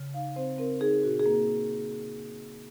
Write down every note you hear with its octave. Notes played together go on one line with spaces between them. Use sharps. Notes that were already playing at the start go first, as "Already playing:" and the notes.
Already playing: C#3
D#4 F5
C4 C5
C4 A#4
D#4 G#4
A#2 F#4
G#4
A#3